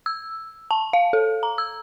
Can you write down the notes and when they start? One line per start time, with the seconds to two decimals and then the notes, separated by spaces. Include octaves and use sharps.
0.06 E6
0.71 A5
0.93 F5
1.13 A4
1.43 A#5
1.58 E6